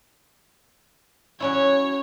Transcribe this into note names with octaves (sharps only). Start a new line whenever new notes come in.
F#3 C#4 E4 C#5